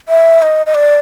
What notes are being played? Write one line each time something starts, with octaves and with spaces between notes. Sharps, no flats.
E5
D#5
D#5
D5